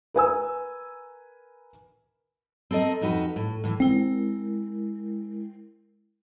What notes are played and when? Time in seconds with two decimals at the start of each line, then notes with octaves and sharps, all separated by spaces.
0.14 A#4 B4 G#5 E6
2.71 C4 A4 A#4 D#5
3.01 F2 D#4 F#4 B4
3.36 A2
3.64 A2 E3
3.80 G#3 C4 E4 A#4